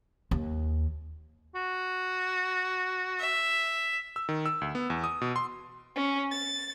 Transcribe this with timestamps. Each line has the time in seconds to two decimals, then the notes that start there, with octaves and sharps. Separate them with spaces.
0.31 D#2
1.55 F#4
3.19 E5
4.16 E6
4.29 D#3
4.46 E6
4.61 D2
4.75 B3
4.90 E2
5.04 D#6
5.21 B2
5.36 C6
5.96 C#4
6.31 A6